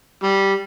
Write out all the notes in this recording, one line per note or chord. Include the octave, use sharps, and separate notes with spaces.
G3